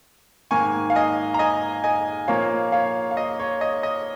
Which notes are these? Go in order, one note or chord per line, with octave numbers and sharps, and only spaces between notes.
G#2 D#3 A#3 G#5 C#6
F5
D#5 G#5
A#5
D#5 G#5
D#5 G#5
A#2 F3 A#3 C#5 F5
C#5 F5
F5
D#5
C#5
D#5
D#5